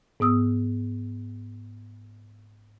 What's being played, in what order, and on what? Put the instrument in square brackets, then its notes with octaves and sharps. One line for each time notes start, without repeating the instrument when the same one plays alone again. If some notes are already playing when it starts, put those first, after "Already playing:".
[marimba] G#2 B3 D#6 E6